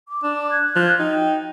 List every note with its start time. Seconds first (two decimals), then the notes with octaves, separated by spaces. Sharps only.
0.08 D6
0.23 D4
0.50 F#6 G#6
0.76 F3
1.00 D#4 F#4 G5